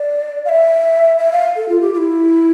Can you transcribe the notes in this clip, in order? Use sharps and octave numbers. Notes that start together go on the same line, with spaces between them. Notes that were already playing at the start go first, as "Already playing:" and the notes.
Already playing: D5
F5
E5
E5
F5
A4
F4
G4
F4
E4